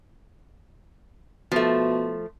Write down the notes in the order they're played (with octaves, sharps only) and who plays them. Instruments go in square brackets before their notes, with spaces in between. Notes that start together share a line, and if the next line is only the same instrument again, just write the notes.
[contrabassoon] B2 [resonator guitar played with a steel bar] F3 A3